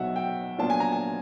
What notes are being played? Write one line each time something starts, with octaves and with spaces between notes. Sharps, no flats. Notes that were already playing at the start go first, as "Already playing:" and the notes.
Already playing: B1 B2 F#3 E5 F#5
G5
A#2 F#3 B3 D4 F4 A5
G#5
A#5
G#5